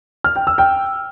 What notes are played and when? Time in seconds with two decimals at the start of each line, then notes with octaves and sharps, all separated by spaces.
0.24 F6
0.36 G5
0.47 E6
0.58 G5